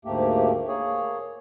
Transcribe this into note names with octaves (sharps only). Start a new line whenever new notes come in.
D2 G#2 A3 A#3 G4
A#3 G#4 C#5